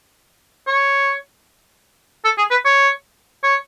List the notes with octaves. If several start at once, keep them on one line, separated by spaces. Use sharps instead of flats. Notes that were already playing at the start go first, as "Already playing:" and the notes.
C#5
A4
G#4
B4
C#5
C#5